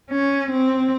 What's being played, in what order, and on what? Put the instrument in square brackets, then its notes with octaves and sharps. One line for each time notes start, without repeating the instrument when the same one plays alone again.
[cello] C#4
C4